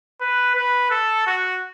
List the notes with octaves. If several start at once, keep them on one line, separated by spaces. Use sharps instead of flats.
B4
B4
A4
F#4